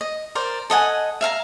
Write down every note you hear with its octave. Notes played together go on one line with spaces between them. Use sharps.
D#5
A#4 C5 D5
A4 D#5 F#5 G#5
E5 F5 A5 A#5